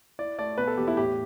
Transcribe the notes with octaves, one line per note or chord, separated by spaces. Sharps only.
E4 D5
A3 D5
B2 B4
A4
E2 G4
E4
A2 G4